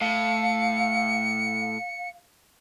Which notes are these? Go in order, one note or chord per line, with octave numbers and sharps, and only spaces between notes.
A2 F5 C#7